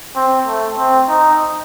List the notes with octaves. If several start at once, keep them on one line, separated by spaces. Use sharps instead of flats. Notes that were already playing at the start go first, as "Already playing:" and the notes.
C4
A3
C4
D#4